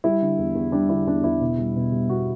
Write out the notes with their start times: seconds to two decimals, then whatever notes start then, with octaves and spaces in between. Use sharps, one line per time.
0.04 G3 E4
0.22 D3
0.39 E2
0.55 E2
0.72 G3 D4
0.89 D3 E4
1.07 E2 D4
1.24 E2 E4
1.41 B2
1.58 G3
1.76 B2
1.92 G3
2.09 B2 F#4